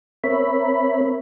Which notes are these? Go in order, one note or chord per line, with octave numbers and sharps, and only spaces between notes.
C4 A#4 C#5 E5 B5